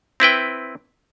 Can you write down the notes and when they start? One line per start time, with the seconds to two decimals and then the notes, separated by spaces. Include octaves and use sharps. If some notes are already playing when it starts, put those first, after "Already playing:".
0.20 C4 E4 B4 G5